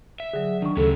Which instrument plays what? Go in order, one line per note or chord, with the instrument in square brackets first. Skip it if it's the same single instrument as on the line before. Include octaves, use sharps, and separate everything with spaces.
[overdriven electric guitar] E5
[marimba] D3 F#3 [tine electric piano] G#4
[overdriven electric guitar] D#3 [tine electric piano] D4 C#6
[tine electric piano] D2 C#3 [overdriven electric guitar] C#4 G4 [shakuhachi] A4